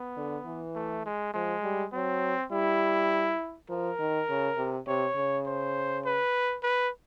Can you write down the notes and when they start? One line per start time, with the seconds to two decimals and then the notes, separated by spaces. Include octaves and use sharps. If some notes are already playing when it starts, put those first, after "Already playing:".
Already playing: B3
0.17 D3
0.46 E3
0.75 A3
1.06 G#3
1.34 F3 G#3
1.64 G3
1.93 F#3 C4
2.52 G3 E4
3.70 F3 A#4
3.99 D#3
4.29 C#3
4.58 C3
4.87 C3 C#5
5.17 C#3
5.46 C5
6.05 B4
6.63 B4